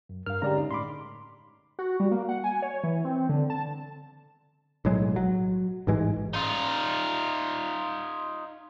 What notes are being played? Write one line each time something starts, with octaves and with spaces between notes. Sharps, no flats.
F#2
G2 A#4 F5 F6
D3 G#3 C#4 G4 D5 A#5
D#4
A2 B5 C6 D6
F#4
G3
A#3
F#5
G#5
C#5
E3
C4
D3
A5
B1 A2 F#3 G#3
F#3
A1 G#2 E3 G#3
D#4 F4